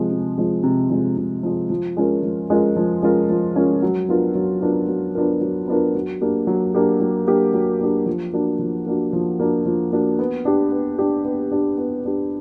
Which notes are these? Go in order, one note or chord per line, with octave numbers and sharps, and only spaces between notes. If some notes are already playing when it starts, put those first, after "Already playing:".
Already playing: C3 F3 G#3
C3
F3 G#3
C3
F3 G#3
C3
F3 G#3
F3
G#3 C#4 F4 A#4
F3
G#3 C#4 F4 A#4
F3
G#3 C#4 F4 A#4
F3
G#3 C#4 F4 A#4
F#3
B3 D4 F4 A#4
F#3
B3 D4 F4 A#4
F#3
B3 D4 F4 A#4
F#3
B3 D4 F4 A#4
F#3
A#3 D4 G4
F#3
A#3 D4 G4
F#3
A#3 D4 G4
F#3
A#3 D4 G4
F3
A#3 D4 F#4
F3
A#3 D4 F#4
F3
A#3 D4 F#4
F3
A#3 D4 F#4
B3
D4 G4
B3
D4 G4
B3
D4 G4
B3
D4 G4